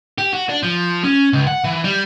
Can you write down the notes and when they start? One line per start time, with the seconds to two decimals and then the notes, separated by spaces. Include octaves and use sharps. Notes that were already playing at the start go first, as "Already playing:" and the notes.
0.18 G4
0.33 F#4
0.49 D4
0.63 F3
1.04 C#4
1.33 C#2
1.47 F#5
1.64 E3
1.84 G3